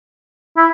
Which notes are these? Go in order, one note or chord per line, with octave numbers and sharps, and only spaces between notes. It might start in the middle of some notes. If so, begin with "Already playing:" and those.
E4